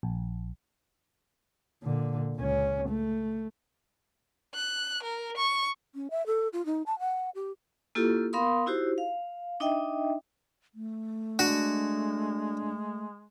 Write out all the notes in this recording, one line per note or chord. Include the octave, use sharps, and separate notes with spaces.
A#1
A#2 D3
C#2 C#4
A3
F#6
A#4
C#6
C#4
E5
A4
F4
D#4
A5
F#5
G4
A#3 E4 F4 G4 A4
B3 A#4 F5 B5 C6 D#6
D#4 E4 F#4 G4 C5
F5
D4 D#4 D#5 E5 G5
A3
G#3 D4 F#4